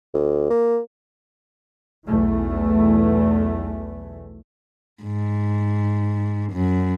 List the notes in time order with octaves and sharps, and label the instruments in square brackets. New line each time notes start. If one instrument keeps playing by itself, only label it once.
[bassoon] D2
A#3
[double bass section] B1 E2 E3 A3
[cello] G#2
F#2